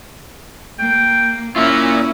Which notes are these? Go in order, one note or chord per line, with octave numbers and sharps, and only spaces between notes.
A#3 G5
A#3 C#4 E4 F4 E5